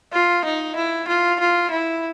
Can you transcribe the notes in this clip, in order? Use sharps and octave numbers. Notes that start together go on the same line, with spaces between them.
F4
D#4
E4
F4
F4
E4